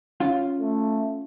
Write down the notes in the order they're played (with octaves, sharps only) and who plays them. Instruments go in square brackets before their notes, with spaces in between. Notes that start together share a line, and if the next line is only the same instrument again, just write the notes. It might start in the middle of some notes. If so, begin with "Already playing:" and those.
[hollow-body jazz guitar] C#4 F4 F5
[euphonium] A3